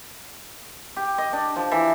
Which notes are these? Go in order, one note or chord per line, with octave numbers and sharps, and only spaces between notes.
G4
D#5
D4
F3
E3